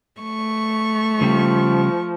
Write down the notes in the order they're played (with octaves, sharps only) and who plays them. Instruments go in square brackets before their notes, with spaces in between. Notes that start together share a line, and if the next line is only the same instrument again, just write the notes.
[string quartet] A3 C#6
[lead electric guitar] C#3 G3 [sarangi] F3